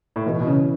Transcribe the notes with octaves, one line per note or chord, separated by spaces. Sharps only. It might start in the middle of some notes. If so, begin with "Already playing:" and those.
A2
B2 E3
B2
C#3 C#4